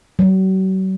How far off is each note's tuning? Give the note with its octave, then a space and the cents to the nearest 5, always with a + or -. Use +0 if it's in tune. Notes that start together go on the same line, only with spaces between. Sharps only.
F#3 +40